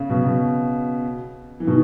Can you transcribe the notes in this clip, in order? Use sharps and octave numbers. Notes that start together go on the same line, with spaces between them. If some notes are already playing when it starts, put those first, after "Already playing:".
Already playing: C#3
B2
B2
E3
B2 D#3